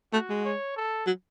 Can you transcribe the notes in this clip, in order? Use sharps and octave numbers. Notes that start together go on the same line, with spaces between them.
A3 F#4
G#3
C#5
A4
F#3